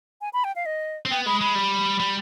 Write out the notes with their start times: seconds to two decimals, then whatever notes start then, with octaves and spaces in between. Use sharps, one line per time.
0.21 G#5
0.33 B5
0.44 G5
0.56 F5
0.66 D#5
1.05 C4
1.11 B3 G5
1.26 G#3 B5
1.41 G#3 B5
1.55 G3
2.00 G3